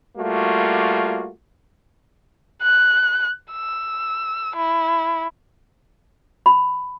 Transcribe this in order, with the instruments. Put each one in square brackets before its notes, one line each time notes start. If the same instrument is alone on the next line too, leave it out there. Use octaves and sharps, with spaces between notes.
[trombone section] G3 A3 A#3 F4 F#4
[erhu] F#6
E6
E4
[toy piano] B5